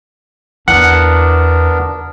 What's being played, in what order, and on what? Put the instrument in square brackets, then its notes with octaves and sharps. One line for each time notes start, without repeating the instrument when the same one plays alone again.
[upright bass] E2 E4 [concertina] B3 D4 A#4 [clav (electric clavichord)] F#5